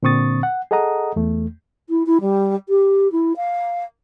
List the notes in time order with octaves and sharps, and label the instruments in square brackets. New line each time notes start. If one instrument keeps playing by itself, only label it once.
[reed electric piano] A#2 D3 C4 C#6 D#6 A6
F#5
G#4 A4 D#5 F#5 A#5 D#6
E2 A3
[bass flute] E4
E4
G3
G4
E4
F5